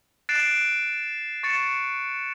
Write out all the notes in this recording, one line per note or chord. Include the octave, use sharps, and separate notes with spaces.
F#6 A6 C7 D7 E7
C#6 A6 C#7 E7